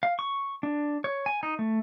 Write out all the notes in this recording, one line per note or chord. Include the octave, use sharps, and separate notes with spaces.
F5
C#6
D4
C#5
G#5
D#4
A3